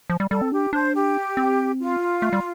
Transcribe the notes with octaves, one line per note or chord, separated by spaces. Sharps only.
F3
G3
G3 A4
C4
D4 G4
D4 C5
G4
C4
F4
A3
G3